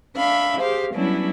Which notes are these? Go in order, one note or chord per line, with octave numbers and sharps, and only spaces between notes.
D4 E5 F5 B5
G4 G#4 C5 F5
F#3 G3 B3 C#4 D4 E4